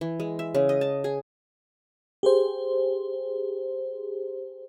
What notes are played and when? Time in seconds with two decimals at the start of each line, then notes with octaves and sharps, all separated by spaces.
0.01 E3
0.20 G#3
0.39 E5
0.55 C#3
0.69 D#5
0.81 A5
1.04 G#4
2.23 G4 G#4 C5